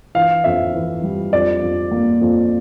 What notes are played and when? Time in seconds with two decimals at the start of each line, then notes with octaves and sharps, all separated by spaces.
0.15 E3 F5
0.44 F2 E5
0.74 E3
1.03 G3
1.33 F2 D5
1.62 F2
1.91 A#3
2.21 F2